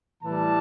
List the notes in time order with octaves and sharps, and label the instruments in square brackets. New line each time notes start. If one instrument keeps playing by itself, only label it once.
[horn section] A2 E3 G3 A5